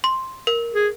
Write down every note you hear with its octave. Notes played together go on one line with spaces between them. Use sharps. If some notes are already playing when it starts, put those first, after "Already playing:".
C6
A#4
G#4